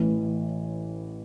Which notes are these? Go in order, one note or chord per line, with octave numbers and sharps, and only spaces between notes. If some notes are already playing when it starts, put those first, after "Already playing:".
Already playing: A1 A2 E3